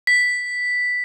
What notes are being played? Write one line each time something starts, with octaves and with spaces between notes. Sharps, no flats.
B6